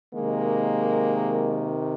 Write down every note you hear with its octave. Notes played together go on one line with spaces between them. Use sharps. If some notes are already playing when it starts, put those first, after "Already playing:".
C3 D#3 G#3 A#3